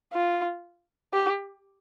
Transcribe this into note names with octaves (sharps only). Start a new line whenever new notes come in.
F4
G4